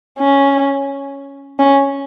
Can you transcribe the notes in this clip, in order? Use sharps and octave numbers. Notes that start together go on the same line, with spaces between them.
C#4
C#4